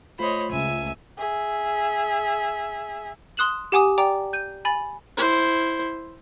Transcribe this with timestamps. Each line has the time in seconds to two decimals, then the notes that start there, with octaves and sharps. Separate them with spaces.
0.19 A3 F4 C5 C#5 D#5 B5
0.52 C#2 E5 G#5
1.18 G#4 E5
3.37 C6 D#6 F#6 E7 F#7
3.72 G4 F#5 G#5 D6 D#6
3.98 D5 G5 A#5 D6
4.33 G6 D#7
4.65 G#5 B5 A6
5.17 E4 C5